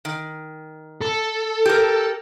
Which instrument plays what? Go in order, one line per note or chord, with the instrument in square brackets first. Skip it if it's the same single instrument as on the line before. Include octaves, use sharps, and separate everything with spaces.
[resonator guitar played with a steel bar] D#3
[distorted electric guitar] A4
[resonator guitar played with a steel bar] G4 A#4